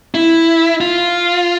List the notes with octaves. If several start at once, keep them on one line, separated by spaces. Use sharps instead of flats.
E4
F4